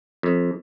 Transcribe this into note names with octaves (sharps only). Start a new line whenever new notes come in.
F2